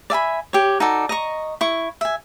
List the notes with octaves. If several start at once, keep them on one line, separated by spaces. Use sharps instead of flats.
D5 E5 G#5 B5
G4 C#5
D#4 F#4 A4 D5
D#5 A#5 C#6
E4 C#6
E5 G#5